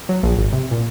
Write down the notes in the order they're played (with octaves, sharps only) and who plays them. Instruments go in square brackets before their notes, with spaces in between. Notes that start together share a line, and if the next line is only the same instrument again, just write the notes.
[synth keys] F#3
A#1
G#1
C3
A#2